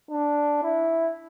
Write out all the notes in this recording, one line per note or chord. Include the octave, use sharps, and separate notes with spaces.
D4
E4